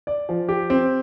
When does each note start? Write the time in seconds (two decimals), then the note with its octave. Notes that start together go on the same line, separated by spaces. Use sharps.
0.07 D5
0.29 F3
0.49 G4
0.70 C4